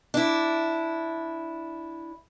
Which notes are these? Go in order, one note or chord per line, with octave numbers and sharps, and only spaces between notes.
D4 E4